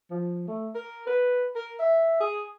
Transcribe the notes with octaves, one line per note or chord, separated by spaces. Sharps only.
F3
A3
A#4
B4
A#4
E5
G#4